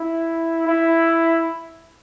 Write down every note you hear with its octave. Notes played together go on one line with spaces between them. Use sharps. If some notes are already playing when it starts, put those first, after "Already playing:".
Already playing: E4
E4